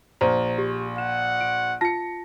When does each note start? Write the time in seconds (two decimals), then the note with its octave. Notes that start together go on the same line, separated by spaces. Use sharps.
0.21 A#1 C5 A#5
0.58 G4
0.98 F#5 E7
1.41 D7
1.81 F4 A5 A#6 C#7